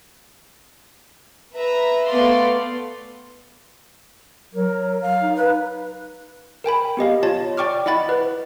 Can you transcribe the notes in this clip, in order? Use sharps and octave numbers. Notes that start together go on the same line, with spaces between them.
B4 E5 A#5
A3 B3 B4 D5 F5 C6
F#3 A#4
F5
D#4
B4
A#4 G5 G#5 B5
B3 G4 D#5 F5
F4 C#5 A5 A6
D5 G5 C#6 D6 F6
E4 D#5 F#5 B5 A6
B4